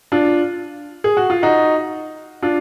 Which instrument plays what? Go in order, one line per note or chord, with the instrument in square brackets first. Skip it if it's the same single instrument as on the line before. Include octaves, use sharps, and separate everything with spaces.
[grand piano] D4 F4
G#4
F#4
F4
D#4 F#4
D4 F4